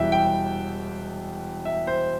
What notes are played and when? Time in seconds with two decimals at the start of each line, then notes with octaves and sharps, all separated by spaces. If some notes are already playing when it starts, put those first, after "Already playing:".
Already playing: E1 E2 E3 G3 E5 G5
0.12 G5
1.65 E5
1.87 C5